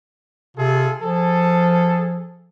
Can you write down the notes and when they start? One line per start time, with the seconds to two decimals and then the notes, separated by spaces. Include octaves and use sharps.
0.57 C3 F4 G#4 A4
1.02 F3 G#4 A4